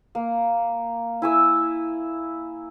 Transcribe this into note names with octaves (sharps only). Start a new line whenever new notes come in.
A#3
E4 G#5 E6